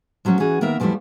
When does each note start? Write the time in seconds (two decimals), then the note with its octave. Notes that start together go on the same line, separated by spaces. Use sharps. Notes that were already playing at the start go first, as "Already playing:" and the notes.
0.25 F3 F#3 A3 C#4
0.40 E3 C#4 F#4 G#4
0.61 D#3 A#3 B3 A#4 E5
0.80 E2 D3 F3 G3 A3 E4